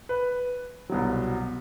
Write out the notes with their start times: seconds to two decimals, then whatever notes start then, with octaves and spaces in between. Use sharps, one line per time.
0.09 B4
0.90 C2 B2 F#3